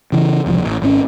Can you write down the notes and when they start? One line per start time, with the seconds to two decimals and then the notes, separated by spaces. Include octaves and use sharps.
0.12 C#3 E3
0.46 E1 C2 C3 F3
0.65 A1
0.82 G#1 C#3 C#4